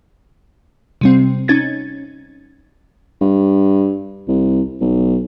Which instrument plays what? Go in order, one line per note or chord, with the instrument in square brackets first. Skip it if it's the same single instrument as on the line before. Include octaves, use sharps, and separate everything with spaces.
[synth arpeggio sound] C3 G3 C4
C#4 D#4 G#6 A6
[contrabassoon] G2
C2
B1